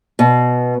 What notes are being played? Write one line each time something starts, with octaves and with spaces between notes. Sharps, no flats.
B2